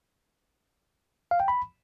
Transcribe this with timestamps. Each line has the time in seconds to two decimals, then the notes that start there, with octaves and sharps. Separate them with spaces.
1.31 F5
1.40 G5
1.48 B5